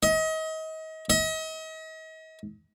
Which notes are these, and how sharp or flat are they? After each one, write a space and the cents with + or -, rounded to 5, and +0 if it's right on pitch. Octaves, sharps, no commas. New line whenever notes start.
D#5 +35
D#5 +40